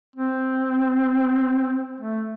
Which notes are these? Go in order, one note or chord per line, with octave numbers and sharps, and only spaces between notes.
C4
A3